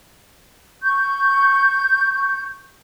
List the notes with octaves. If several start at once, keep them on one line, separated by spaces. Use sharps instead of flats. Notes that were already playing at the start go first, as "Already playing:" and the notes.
C#6 G6